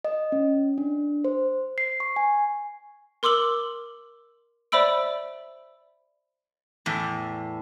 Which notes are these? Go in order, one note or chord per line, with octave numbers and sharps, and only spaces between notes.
D#5
C#4
D4
C5
C7
C#6
G#5
A#4 C6 D6 E6 F#7
C5 D5 E5 B5 E6 D7
E2 A2